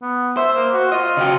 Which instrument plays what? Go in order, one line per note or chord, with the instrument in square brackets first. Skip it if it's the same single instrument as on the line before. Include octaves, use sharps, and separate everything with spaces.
[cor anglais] B3
[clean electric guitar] C5 [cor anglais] E5
[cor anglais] A#3
F#4
[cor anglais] F4 [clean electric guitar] D#5
[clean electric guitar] C#3 F#4 G5